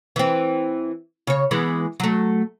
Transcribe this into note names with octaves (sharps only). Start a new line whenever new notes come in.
E3 C4
C#3 C#5
E3 G#3 B3
F#3 A3